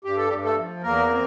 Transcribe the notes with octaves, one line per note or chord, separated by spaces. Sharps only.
G2 G4
A4
G2 G3 G4
A3 A4
F3
E2 A#3 A#4
C4